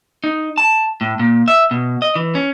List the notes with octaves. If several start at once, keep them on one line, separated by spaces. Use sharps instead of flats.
D#4
A5
A2
A#2
E5
B2
D#5
E3
C#4